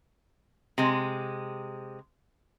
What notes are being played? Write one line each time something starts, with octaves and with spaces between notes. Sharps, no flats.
C3 G#3